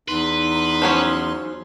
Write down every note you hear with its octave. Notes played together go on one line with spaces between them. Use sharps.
E2 D#4 B4 C6
F3 F#3 C#4